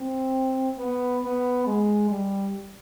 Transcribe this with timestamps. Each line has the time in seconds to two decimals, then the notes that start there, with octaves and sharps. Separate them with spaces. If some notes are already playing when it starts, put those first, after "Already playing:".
Already playing: C4
0.78 B3
1.23 B3
1.66 G#3
2.10 G3